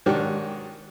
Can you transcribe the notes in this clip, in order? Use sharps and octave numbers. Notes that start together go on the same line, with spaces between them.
G#2 D#3 F#3 D4 F#4 G4